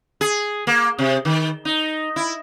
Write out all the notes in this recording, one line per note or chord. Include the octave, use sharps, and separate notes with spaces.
G#4
A#3
C3
D#3
D#4
E4